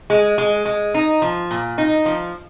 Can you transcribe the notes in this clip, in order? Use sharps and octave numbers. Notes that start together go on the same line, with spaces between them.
G#3
G#3
G#3
D#4
F3
A#2
D#4
F3